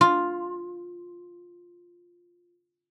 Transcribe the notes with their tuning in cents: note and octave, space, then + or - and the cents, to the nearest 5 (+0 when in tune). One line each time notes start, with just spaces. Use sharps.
F4 +5